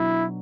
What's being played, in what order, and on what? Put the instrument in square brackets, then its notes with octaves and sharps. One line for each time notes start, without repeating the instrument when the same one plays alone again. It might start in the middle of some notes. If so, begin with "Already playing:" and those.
Already playing: [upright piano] B2 F#3 D4 [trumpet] E4